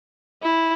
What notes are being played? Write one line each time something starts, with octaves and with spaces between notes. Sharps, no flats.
E4